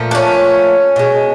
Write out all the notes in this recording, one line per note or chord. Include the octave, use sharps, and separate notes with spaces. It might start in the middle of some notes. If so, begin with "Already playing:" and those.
Already playing: A#2 F3 A3
D4
C#4
B2 G#3